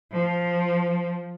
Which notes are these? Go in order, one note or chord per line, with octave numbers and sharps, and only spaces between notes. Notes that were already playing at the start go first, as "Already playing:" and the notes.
F3